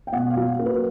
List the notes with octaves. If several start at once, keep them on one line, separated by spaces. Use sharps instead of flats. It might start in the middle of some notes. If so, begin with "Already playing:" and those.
G5
B2 F#5
F5
F#3
A#3
B4